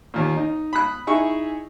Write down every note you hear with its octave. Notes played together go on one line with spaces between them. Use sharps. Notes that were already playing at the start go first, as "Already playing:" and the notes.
D#2 A#2
D#4
B5 D#6 F#6
D#4 E4 G#4 C#6